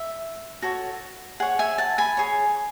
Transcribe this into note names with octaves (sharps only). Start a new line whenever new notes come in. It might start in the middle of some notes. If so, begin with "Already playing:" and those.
Already playing: E5
F#4 A4 C#5
G#4 C#5 F#5
E5 G#5
F#5 A5
G#5 B5
G#4 C#5